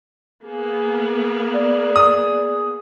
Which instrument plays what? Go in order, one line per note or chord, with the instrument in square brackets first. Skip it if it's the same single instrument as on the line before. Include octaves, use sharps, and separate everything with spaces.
[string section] A#3 B3 [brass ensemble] G#4
[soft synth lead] D5
[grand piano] D#6